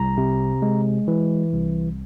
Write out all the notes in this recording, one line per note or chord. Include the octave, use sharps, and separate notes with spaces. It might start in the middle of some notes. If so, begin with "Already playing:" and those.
Already playing: C2 A#5
C3
G#3
E3
C2